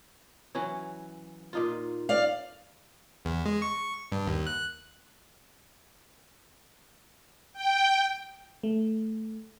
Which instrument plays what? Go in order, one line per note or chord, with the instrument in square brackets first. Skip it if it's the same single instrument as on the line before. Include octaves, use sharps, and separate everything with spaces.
[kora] E3 F#3 C#4
A#2 D#4 F4
[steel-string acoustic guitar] D5 F5
[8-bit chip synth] E2
G#3
C#6
G2
D#2
F#6
[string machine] G5
[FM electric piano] A3